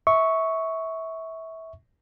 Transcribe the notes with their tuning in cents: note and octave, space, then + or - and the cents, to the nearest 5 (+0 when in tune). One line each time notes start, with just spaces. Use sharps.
E5 -25 C#6 +0